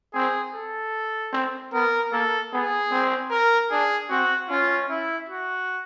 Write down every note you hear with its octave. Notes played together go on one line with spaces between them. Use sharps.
C4 G#4
A4
C4
B3 A#4
A#3 A4
B3 G#4
C4
A#4
D4 G#4
C4 F#4
C#4 F4
E4
F#4